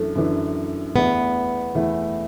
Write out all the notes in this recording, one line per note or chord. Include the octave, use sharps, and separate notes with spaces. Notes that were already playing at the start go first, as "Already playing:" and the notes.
Already playing: F#2 E3 A3 D4
F#2 E3 D4
E2 E3 A3 B3 E4
E2 E3 A3 E4